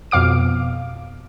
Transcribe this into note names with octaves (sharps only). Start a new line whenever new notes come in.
F2 B2 F5 D6 D7